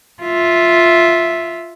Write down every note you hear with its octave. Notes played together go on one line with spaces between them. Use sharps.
F4 E5